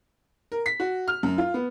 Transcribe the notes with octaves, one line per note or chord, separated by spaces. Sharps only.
A#4
B6
F#4
F6
F#2
F4
B3